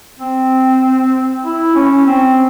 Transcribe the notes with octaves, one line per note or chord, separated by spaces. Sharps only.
C4
E4
C#4
C4